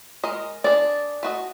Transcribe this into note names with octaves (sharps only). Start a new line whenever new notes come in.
G#3 A#4 D#5
D4 G#4 D5
A3 F#4 D#5